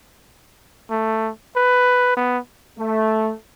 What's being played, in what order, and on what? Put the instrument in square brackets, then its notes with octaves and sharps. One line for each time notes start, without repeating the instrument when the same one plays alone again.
[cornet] A3
B4
B3
[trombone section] A3